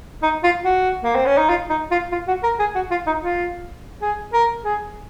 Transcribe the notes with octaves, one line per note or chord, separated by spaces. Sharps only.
D#4
F4
F#4
A#3
C4
C#4
D#4
F4
D#4
F4
F4
F#4
A#4
G#4
F#4
F4
D#4
F4
G#4
A#4
G#4